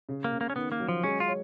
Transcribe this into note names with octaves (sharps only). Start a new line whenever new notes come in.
C#3
A#3
C#3
A#3
C#4
D#3 B3
A#3
F#3
F3
G#3 C#4
F4
C#5